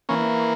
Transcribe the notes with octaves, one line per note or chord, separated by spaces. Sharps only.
E3 A#3 C#4